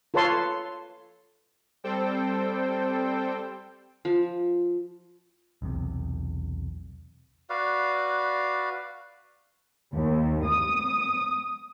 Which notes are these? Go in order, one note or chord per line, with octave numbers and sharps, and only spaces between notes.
F4 A4 B4 C#5 A5 C6
G3 C4 A4 C5 G5
F3
B1 E2 C3
F#4 B4 D5 F5
D#2
D#6